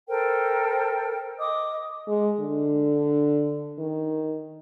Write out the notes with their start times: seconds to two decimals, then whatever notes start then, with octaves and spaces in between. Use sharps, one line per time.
0.08 A4 A#4 C5 G5
1.40 D#5 D6 D#6
2.08 G#3
2.40 D3
3.79 D#3